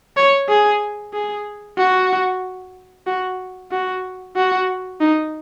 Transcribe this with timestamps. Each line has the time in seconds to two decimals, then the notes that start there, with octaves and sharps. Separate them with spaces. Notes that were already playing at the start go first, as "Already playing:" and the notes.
0.17 C#5
0.49 G#4
1.14 G#4
1.78 F#4
3.07 F#4
3.71 F#4
4.36 F#4
5.01 D#4